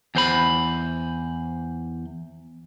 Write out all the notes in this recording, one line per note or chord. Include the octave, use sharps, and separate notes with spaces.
E2 C5 B5